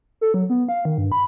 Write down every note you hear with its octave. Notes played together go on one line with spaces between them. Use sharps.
A4
F#3
B3
F5
D#3
G2
B5